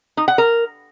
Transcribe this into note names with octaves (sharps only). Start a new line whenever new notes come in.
D#4
F#5
A#4